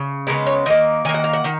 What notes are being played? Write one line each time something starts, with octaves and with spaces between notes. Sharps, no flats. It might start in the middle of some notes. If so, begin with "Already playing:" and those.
Already playing: C#3
C#3 G#3 B3 A#4
C#5
D#3 A#3 D#5
D#3 A#3 G#5
F#5
F5
F#5
D#3